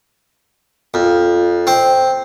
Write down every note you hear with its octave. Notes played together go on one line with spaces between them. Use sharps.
F2
C4